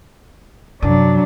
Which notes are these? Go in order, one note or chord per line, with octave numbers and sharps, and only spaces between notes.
F#2 C3 F#3 D4